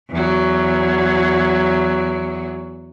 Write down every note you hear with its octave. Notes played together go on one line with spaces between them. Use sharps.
E2 F#3